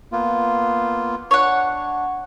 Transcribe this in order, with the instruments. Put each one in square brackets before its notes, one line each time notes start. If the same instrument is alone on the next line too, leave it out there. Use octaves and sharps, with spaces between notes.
[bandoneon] A#3 B3 F4
[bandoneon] D4 [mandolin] C#5 F#5